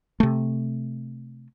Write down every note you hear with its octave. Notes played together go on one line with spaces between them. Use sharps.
C3 A3